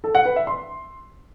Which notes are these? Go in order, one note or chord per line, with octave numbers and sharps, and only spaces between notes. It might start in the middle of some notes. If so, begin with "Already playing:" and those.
A4
F#5
B4
E5
C6